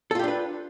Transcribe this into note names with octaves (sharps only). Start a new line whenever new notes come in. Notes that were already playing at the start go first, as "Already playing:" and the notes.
D4 F4 G4 A4 B4